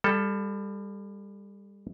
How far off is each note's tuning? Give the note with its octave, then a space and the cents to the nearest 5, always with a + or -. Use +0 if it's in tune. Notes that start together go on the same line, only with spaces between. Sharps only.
G3 +30 A4 +0